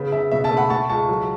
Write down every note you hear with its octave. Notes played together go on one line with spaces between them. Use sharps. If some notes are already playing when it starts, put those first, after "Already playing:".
Already playing: C#3 B3
C#3 E5
B2 E5
E5 A5
A3
F#5 B5
A3 A5 C#6
C#2 A5 C#6
F#3